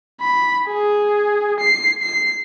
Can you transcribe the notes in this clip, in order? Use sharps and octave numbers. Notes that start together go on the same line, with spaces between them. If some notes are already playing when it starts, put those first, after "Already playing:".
B5
G#4
C7
C7